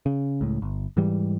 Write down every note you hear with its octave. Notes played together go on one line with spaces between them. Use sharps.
C#3
C#2 A2
G1
G#2 E3 G3